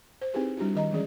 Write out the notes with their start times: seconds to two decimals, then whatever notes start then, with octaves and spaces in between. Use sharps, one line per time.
0.22 C5
0.34 C4 D#4 E4 G4 G#4 B4
0.57 G3 D4 E4 F#4 G4
0.75 D#3 D#5 A#5
0.91 E3 G#3 C#4 G#4 D5